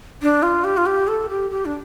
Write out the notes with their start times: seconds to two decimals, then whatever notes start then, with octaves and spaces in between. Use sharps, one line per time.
0.22 D4
0.43 F4
0.64 G4
0.77 F4
0.86 G4
1.08 A4
1.29 G4
1.51 G4
1.65 D4